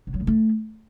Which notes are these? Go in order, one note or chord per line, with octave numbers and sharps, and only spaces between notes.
B2
F#3
C#3
A3